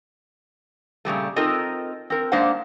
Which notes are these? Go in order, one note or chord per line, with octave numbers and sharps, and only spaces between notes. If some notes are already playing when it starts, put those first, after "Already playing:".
A#2 C#3 G3 A3
C4 D#4 F4 A4 A#4 D#5
C4 A#4
G#3 A#3 D4 C5 F5 F#5